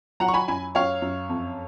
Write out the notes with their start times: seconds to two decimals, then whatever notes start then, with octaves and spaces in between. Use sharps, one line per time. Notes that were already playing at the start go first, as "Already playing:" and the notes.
0.20 F#3 F#5 A#5
0.28 C#6
0.34 G#5 B5
0.48 F#2 G#5 B5
0.75 F#2 C#5 F5
1.02 F#2
1.29 F2